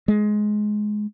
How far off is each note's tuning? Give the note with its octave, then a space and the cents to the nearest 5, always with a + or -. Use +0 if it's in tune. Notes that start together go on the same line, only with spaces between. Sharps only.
G#3 +15